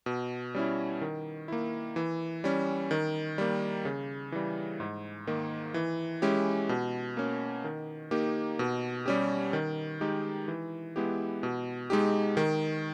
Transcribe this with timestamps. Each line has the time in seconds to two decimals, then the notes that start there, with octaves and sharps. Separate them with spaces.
0.06 B2
0.55 G3 C#4 E4
1.01 D#3
1.48 A#3 E4
1.96 E3
2.44 G3 C#4
2.91 D#3
3.38 G3 A#3
3.85 C#3
4.32 E3 G3
4.80 G#2
5.27 D#3 A#3
5.74 E3
6.22 G#3 C#4 E4 G4
6.69 B2
7.17 A#3 C#4
7.64 D#3
8.11 A#3 D#4 G4
8.59 B2
9.06 G3 C#4 G4
9.53 D#3
10.01 G#3 D#4 G4
10.48 E3
10.96 G#3 B3 E4 G4
11.43 B2
11.90 G#3 D#4 G4
12.37 D#3